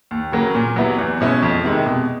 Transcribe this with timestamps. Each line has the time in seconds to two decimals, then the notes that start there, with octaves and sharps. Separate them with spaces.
0.11 D#2
0.32 C#3 F#3 A#3
0.55 A#2
0.76 F#3 B3 E4 G4
0.99 E2
1.21 B2 G#3 C#4 E4
1.42 F2
1.64 C3 D#3 G#3
1.86 B2